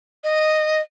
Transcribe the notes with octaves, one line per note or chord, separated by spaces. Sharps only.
D#5